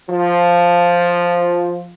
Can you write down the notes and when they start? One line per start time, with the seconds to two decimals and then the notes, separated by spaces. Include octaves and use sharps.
0.10 F3